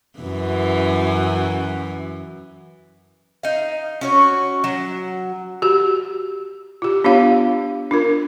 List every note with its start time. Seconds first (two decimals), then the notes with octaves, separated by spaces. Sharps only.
0.19 F#2 E3
3.43 D#4 F5
4.01 C#4 F#4 C#5
4.64 F#3
5.62 F#4 G4
6.82 F4 G4
7.04 B3 D4 F4 G4 C#5 F5
7.91 D4 F4 A#4